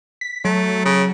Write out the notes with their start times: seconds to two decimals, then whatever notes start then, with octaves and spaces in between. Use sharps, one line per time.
0.21 B6
0.44 F#3 A3
0.85 C#3